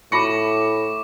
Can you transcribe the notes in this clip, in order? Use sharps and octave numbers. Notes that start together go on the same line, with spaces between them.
A2 B5 C#6 D6 A#6 C#7